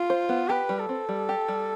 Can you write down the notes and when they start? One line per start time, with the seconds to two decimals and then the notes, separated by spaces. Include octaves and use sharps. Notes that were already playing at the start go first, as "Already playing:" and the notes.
Already playing: F4
0.10 C5
0.29 B3
0.49 G4 B4
0.69 G3
0.79 A4
0.89 C4
1.09 G3
1.29 G4
1.48 G3